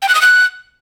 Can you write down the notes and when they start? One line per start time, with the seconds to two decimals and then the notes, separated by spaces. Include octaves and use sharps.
0.02 G5
0.09 F#6
0.15 D#6
0.21 F#6